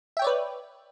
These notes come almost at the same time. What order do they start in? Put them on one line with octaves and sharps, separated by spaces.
E5 G5 C#5 D5 B4